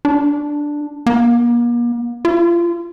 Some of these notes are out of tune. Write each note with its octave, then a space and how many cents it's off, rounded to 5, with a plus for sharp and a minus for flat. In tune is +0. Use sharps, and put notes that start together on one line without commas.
D4 +0
A#3 +40
F4 -30